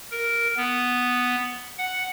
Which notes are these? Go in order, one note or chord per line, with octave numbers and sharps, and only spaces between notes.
A#4
B3
F#5